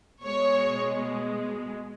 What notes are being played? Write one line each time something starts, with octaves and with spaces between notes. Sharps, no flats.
B2 G#3 C#5